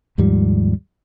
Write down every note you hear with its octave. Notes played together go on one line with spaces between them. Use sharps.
D#2 G#2 F3 G3